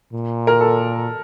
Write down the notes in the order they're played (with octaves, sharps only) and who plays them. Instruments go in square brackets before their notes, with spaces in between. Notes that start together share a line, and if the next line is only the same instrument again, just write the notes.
[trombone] A#2
[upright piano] A#4
A4